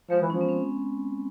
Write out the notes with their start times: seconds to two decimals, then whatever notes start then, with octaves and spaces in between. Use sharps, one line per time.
0.10 F3 G#3
0.22 E3
0.30 F3 C#4
0.41 B3
0.49 C4